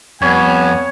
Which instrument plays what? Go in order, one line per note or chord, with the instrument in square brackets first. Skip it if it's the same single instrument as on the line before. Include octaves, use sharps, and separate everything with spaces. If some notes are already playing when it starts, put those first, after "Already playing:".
[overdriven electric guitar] F2 [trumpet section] G3 B3 [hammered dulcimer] C#5 [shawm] G#5